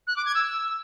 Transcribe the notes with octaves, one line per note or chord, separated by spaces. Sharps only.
F#6
D6
G#6
E6